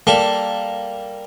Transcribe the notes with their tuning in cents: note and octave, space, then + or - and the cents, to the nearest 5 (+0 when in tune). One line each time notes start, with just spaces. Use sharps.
G3 +0 A#3 +0 A4 +0